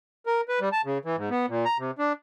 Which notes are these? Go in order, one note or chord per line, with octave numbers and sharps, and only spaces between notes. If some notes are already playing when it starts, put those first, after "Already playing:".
A#4
B4
G3
A5
C#3
E3
G#2
B3
A#2
A#5
C3
D4